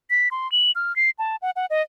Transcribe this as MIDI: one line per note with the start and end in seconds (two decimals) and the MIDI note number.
0.10 0.29 95
0.31 0.50 84
0.52 0.71 102
0.75 0.95 89
0.96 1.10 96
1.19 1.36 81
1.42 1.51 78
1.56 1.66 78
1.70 1.82 75